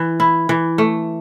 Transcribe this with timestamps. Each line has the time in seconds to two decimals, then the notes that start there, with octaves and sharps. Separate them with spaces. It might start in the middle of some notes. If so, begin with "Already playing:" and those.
Already playing: E3
0.20 E4
0.49 E3
0.78 A3